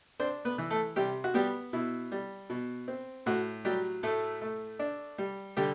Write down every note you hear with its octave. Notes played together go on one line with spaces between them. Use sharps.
C4 D4 C5
B3 B4
E3
A3 A4
C3 G3 G4
F#4
G3 B3 G4
B2 E4
G3
B2
C4
A2 F#4
F#3 G3 G4
A2 A3 A4
A3
D4
G3
D3 G3 G4